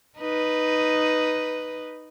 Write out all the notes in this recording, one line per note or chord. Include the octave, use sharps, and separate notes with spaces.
D#4 B4